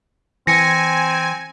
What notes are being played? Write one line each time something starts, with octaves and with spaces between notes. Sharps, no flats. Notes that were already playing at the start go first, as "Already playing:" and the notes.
E3 C4 G#5 A#6 C#7